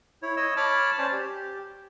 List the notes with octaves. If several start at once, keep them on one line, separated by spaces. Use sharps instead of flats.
E4 C#5
C#5 D#5 E6
C#5 A5 B5 D6 F6
C#4 C5 D5 A5
G4